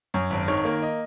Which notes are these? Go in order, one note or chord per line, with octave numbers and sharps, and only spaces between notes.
F#2 C#5
G#1
D#3 C#5
A#3
D#5